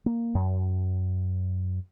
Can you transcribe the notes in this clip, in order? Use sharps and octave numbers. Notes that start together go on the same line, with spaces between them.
A#3
F#2